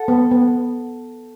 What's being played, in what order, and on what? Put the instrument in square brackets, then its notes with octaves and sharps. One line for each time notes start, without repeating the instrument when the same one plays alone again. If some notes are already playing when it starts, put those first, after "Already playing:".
Already playing: [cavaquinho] A4 F#5
[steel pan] B3
B3